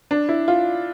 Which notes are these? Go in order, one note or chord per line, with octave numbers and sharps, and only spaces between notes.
D4
E4
F4